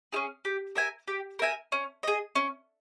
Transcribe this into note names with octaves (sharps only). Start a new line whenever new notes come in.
C#4 E4 G#4
G4
A#4 E5 G#5
G4
A#4 E5 G#5
C#4
G#4 D#5
C#4